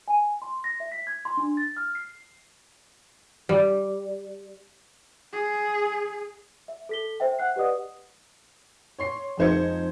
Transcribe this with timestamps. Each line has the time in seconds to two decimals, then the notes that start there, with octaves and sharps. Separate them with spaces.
0.08 G#5
0.42 C6
0.64 A#6
0.80 E5
0.92 B6
1.07 G#6
1.25 C6
1.37 D4
1.57 A6
1.77 F6
1.95 C7
3.49 G3
5.33 G#4
6.68 E5
6.89 A4 B6 G7
7.20 C5 E5 G5
7.39 F#5 F#6 C7
7.56 G4 B4 D5 D#5 F#5 D#6
8.99 C#5 C6 C7
9.37 F2 G#3 D#4 C5 G#6 C#7